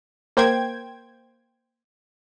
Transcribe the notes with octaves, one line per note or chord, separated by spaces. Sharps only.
A#3 C5 G5 G#6